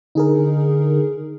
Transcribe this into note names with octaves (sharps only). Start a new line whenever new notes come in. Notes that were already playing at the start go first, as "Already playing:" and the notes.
D3 D#4 G#4 A#4